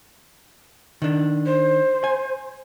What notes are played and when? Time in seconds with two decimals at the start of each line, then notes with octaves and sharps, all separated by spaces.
1.02 D#3 D4
1.46 C5
2.04 G#5